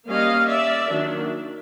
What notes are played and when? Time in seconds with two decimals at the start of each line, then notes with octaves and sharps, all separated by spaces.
0.09 G3 A#3 C#4 D#5 F5
0.49 D5 E5
0.90 D#3 F#3 A#3 D4